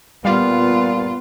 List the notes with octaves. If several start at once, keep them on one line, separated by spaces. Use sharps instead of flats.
A#2 G3 B3 F4 F5